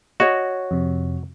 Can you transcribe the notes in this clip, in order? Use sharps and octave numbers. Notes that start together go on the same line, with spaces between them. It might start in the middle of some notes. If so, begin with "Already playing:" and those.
F#4 C#5 D#5
F2 C3